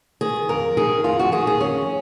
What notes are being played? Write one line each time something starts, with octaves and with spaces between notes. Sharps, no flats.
D#3 G#4
F2 A#4
D#3 G#4
F2 F4
F#4
D#3 G#4
G#4
F2 C#4